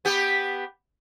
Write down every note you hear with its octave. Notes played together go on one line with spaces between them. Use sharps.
B3 G4